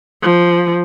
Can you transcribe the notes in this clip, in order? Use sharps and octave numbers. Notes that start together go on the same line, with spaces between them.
F3